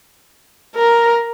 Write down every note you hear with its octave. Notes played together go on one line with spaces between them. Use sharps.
A#4